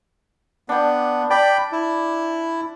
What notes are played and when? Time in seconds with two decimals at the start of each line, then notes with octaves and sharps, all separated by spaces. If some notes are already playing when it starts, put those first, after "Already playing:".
0.69 B3 D4 G5
1.30 D5 G5 B5
1.72 E4